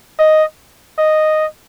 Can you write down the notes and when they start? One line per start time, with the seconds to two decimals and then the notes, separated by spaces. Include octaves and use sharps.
0.19 D#5
0.98 D#5